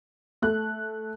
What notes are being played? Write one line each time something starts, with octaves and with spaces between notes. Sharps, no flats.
A3 F#6